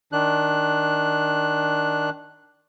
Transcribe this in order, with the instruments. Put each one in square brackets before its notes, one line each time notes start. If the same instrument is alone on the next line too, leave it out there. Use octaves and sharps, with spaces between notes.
[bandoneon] D#3 D4 F#6